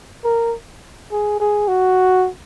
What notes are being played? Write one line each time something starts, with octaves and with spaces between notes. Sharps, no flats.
A#4
G#4
G#4
F#4